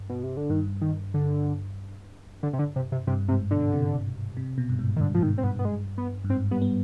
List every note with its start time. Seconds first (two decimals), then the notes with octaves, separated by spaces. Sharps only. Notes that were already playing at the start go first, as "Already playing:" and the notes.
Already playing: G2
0.09 B2
0.23 C3
0.37 D3
0.50 G2 D#3
0.81 D#3
1.14 D3
2.43 D3
2.53 C3
2.59 D3
2.76 C3
2.92 C3
3.07 G2 C3
3.28 G#2 C3
3.51 B2 D3
3.72 C3
4.37 C3
4.58 B2
4.69 G2
4.79 G#2
4.96 D#3
5.01 G2 D3
5.14 B2 F3
5.22 G#2 D#3
5.38 C4
5.43 G2 B3
5.59 B3
5.65 G#3
5.98 B3
6.25 G2
6.29 G#2 C4
6.51 G3 B3
6.62 B3